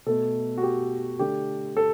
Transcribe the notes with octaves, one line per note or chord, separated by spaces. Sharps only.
B2 A3 A4
F#4
G4
D3 A3 G4
A4